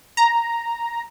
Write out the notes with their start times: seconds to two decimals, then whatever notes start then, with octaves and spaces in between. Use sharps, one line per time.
0.17 A#5